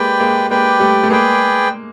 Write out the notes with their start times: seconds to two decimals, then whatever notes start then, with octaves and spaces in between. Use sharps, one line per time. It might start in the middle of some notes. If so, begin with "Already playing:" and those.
Already playing: G#3 A#3 G4 B4 D5 G5
0.20 G#3 A#3
0.50 G#3 A#3 G4 B4 D5 G5
0.80 G3 A3
1.04 A3
1.10 G#3 A#3 G#4 B4 D5 G5